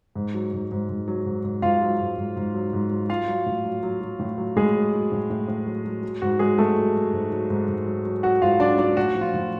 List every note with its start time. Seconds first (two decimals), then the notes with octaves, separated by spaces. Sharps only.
0.15 G#2
0.34 F#3
0.53 G#2
0.72 G#2
0.89 G#2
1.08 F#3
1.26 G#2
1.44 G#2
1.62 G#2 F4 F5
1.81 F#3
2.00 G#2
2.18 G#2
2.36 G#2
2.54 F#3
2.73 G#2
2.91 F#3
3.09 F#3 F4 F5
3.28 F#3
3.46 A2
3.65 F#3
3.83 F#3
4.01 F#3
4.19 A2
4.38 F#3
4.56 A2 G#3 G#4
4.75 F#3
4.93 F#3
5.12 A2
5.30 A2
5.48 A2
5.66 F#3
5.85 F#3
6.03 F#3
6.22 G#2 F#4
6.39 F#3 G#3 G#4
6.58 F#3 A3 A4
6.77 F#3
6.95 F#3
7.13 G#2
7.31 F#3
7.50 G#2
7.68 G#2
7.86 F#3
8.05 F#3
8.23 F#3 F#4 F#5
8.42 G#2 F4 F5
8.60 F#3 D4 D5
8.78 F#3 D4 D5
8.97 A2 F#4
9.15 F3
9.21 F4
9.34 A2